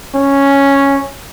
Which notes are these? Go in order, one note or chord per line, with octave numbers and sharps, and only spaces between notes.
C#4